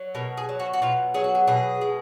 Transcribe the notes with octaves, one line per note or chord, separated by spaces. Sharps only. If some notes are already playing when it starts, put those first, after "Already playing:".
Already playing: F#3
B2 A#4
G#4
F#3
F#4
F#4
B2 F4
F#3 G#4
F#4
G#4
B2 G#4
G#3